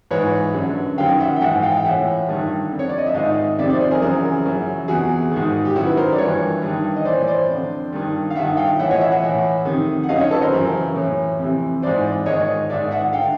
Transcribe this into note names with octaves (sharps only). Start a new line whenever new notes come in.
G#2 E3 B4 C#5
F#2 D3
F#2 D#3 F5 G5
E5 F#5
G5
G#2 E3 E5 F#5
F5 G5
G5
A2 E3 E5 F#5
G2 D#3
F2 D3
C#5
D5
D#5
E5
G#2 D#3 D#5 F5
F2 C3 D#3 D5 E5
C5 D5
C5 D5
G#4 A#4
F#2 C#3 E3 G#4 A#4
F#2 C#3 E3
E2 C3 E3 F#4 G#4
G#2 D#3
G4
F#2 D#3 E4 F#4
B4
A#4 C5
D5
G2 E3 B4 C#5
G2 D#3
D#5
A2 E3 C5 D5
C5 D5
F2 D3
G2 D#3
F5
G2 D#3 E5 F#5
F5 G5
A2 E3 E5 F#5
C#5 D#5
E5 F#5
E5 F#5
A2 E3
F2 C3 D#3
F#5
F#2 D#3 D#5 F5
C#5 D#5
A4 B4
A#4 C5
F#2 C#3 E3
A2 E3
F2 C3 E3
G#2 E3 C5 D5
G#2 D#3 C#5 D#5
G#2 D#3 D5 E5
E5 F#5
D3 F5 G5